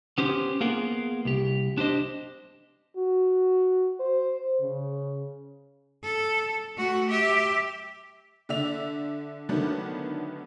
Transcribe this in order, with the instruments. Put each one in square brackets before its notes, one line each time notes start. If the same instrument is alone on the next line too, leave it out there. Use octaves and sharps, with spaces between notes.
[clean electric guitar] B3 C#4 G4 C5
A#3 B3 F4 G#4 A#4
C2 G4
D4 G4 C5 D#5
[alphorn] F#4
C5
C#3
[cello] A4
A3 F#4
G4 E5
[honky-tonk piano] D3 D5 E5 F7
D3 D#3 F#3 A3 B3 D4